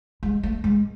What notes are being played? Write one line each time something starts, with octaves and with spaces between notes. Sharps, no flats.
G#3
A3
G#3